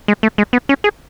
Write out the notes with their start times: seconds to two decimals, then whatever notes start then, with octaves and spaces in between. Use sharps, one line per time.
0.08 G#3
0.23 A3
0.38 G#3
0.53 B3
0.69 C#4
0.84 G#4